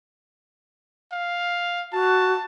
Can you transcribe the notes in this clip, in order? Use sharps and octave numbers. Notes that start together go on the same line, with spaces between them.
F5
F#4 A5